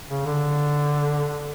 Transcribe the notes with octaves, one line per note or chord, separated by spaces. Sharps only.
C#3
D3